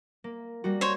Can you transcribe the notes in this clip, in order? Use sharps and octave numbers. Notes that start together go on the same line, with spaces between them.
A#3
G3 A#3 F#4
C5 C#5